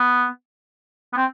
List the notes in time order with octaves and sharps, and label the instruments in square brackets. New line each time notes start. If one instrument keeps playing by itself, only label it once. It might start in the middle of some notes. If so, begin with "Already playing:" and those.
Already playing: [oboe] B3
B3
C4